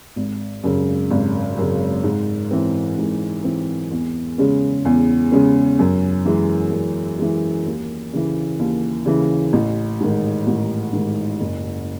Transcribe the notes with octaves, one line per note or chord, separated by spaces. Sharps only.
G#1
F#2 C#3
G#1
F#2 C#3
G#2
E3 C4
G#2
E3 C4
E2
C#3 G#3 C#4
E2
C#3 G#3 C#4
F#2
E3 G#3
F#2
E3 G#3
D#2
C#3 E3
D#2
C#3 E3
A1
G#2 D#3
A1
G#2 D#3
F#1